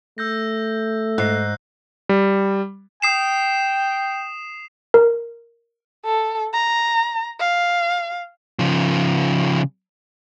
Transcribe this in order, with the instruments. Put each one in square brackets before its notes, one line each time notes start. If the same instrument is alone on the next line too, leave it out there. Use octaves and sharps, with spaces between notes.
[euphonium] A3 [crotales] E6 G6 A#6
[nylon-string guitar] G#2 [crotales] F#6 C7
[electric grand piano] G3
[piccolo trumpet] G5 [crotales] D#6 C7 E7
[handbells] A#4
[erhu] A4
A#5
F5
[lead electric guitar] C#3 F3